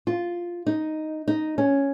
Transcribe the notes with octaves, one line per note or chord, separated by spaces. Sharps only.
F4
D#4
D#4
C#4